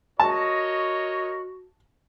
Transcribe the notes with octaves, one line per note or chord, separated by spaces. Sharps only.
F#4 A#4 C#5 D#5 A5